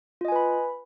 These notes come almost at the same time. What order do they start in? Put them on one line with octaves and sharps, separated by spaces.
F4 D#5 G#5 B4 B5